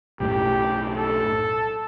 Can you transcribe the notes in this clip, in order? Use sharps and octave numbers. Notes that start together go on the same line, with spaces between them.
B1 F#2 A2 G4
A4